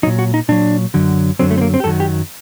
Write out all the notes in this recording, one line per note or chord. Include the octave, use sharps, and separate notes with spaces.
A#2 F#3 D#4
F#4
D#4
A#2 F#3 D4
F#2 D3 F#3
F#2 D3 F#3 C4
A3
C4
A#3
C4
G4
F#2 D#3 F#3 A4
G4